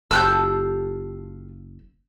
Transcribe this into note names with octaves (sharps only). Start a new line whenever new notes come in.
F#1 F4 G4 A4 E6 F#6 G6